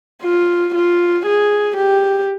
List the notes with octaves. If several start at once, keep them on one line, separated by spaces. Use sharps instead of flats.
F4
F4
G#4
G4